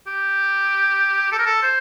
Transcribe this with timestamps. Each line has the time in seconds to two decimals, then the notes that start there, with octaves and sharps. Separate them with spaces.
0.07 G4
1.32 A4
1.39 A#4
1.46 A4
1.63 C5